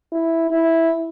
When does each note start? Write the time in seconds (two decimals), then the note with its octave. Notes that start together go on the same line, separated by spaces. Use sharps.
0.12 E4
0.51 E4